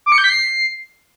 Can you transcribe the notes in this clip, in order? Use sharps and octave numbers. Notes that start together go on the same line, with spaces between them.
D6
C#7
G6
B6
C7